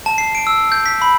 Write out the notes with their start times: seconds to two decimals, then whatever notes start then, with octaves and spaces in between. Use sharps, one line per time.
0.06 A5
0.18 C7
0.35 D7
0.47 E6
0.72 G6
0.86 B6
1.02 B5